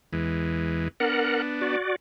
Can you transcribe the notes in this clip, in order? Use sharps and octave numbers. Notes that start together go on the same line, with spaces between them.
E2 E3 G#3
B3 D4 A#4 F#5
F#4 D5